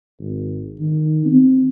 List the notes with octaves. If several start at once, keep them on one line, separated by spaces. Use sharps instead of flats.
G#1
D#3
C4